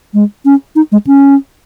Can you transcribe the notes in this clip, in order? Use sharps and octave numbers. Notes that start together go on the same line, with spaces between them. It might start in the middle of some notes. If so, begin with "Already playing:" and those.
G#3
C#4
D#4
G#3
C#4